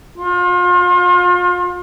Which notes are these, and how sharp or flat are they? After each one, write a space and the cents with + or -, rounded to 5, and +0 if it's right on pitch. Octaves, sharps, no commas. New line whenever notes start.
F4 +35